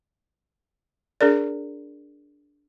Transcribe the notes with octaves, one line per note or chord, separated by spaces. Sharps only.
D4 G#4 A#4 D5